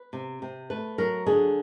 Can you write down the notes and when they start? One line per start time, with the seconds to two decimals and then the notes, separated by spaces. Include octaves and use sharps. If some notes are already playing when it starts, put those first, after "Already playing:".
Already playing: B4
0.13 C3
0.42 C3
0.70 A3 B4
0.98 F#3 A#4
1.26 D3 G#4